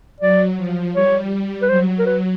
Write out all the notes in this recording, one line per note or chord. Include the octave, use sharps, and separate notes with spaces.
F#3 D5
F3
G3 C#5
B4
F#3 C5
A#4
B4